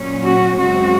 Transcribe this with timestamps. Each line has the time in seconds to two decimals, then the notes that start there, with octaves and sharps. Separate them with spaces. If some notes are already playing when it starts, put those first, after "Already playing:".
Already playing: A#2 F#3 C#4
0.22 F#4
0.58 F#2 C#3 G#3 C4 F#4